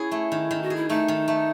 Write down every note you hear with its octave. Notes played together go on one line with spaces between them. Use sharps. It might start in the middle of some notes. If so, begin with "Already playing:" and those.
Already playing: C#4 E4 G#4
A3
D#3
D#3
F#4
G#4
E4
A3 D#4
D#3
A3